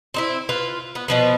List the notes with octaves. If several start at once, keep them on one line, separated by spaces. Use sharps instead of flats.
C4 D#4 E4
F4 B4
B3
B2 F3 B3